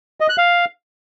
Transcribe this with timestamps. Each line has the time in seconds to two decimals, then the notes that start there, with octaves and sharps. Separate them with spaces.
0.20 D#5
0.29 F#6
0.38 F5